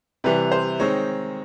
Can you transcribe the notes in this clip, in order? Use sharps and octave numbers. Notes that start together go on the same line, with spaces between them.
C3 E3 G3 B4
C5
D#3 G#3 C4 D#4 C#5